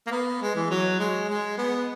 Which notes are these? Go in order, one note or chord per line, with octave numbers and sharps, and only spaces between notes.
A#3
B3
G#3
E3
F#3
G#3
G#3
B3